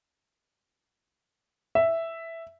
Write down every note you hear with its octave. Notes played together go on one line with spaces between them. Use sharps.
E5